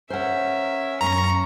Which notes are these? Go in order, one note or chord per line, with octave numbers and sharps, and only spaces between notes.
C#4 A#4 C5 E5 F#5
F#2 C#4 A#5 C#6